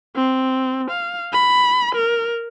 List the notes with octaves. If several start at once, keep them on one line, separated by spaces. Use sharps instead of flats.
C4
F5
B5
A#4